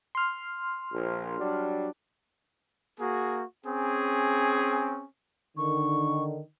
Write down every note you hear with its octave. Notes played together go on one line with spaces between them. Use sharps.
C6 F6
A#1
F#3 G3 D4
A#3 F#4 G#4
C4 C#4 G#4
D3 D#3 C#6